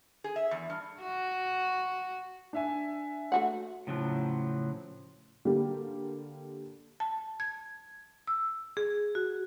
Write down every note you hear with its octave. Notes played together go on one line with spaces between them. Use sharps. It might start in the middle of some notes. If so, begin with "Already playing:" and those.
G#4
E5
E2
G2
F#4
D4 E5 G#5
A3 F#4 F#5
A2 C#3 F3 F#3
D3 G3 A#3 G4
A5
G#6
E6
G#4
F#4